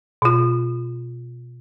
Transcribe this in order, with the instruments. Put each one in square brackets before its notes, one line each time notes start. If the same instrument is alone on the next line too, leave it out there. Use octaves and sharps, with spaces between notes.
[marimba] B2 F4